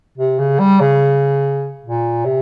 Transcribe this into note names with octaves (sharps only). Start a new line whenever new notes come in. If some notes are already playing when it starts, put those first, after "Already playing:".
C3
C#3
G3
C#3
A#2
C3